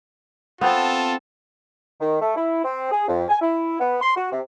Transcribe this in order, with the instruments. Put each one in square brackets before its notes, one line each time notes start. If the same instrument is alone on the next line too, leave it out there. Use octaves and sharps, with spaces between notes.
[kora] B3 C4 [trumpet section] F4 A4 A5
[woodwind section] D#3
A3
E4
C4
G#4
F2
G#5
E4
B3
C6
F#4
C3